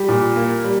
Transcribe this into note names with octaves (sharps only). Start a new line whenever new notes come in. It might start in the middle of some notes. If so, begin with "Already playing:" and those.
Already playing: G3 G4
A#2
A#3
G3